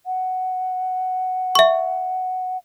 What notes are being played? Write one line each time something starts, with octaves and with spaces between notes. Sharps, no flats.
F#5
E5 C#6